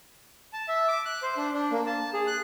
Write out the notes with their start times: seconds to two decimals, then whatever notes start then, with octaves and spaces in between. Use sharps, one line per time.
0.53 A5
0.68 E5
0.88 D6
1.06 F#6
1.23 C5
1.37 D4
1.54 D4
1.71 A#3
1.87 A5
2.14 G#4
2.27 F#6